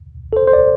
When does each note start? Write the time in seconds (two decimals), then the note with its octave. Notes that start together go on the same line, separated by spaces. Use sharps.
0.33 A4
0.37 C5
0.47 C5
0.53 D5